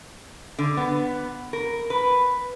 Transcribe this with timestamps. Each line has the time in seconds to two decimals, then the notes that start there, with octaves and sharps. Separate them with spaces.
0.59 D3
0.77 B3
1.53 A#4
1.90 B4